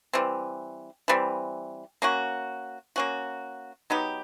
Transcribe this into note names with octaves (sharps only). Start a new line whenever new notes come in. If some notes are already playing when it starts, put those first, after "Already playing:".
E3 G3 C4
E3 G3 C4
A#3 C#4 F#4
A#3 C#4 F#4
F#3 B3 D#4 G4